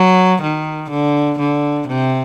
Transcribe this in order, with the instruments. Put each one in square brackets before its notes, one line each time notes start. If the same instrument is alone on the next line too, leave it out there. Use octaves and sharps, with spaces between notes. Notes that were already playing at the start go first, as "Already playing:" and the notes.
Already playing: [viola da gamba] F#3
D#3
D3
D3
C3